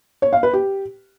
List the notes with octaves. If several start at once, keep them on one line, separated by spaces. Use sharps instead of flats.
C#5
F5
B4
G4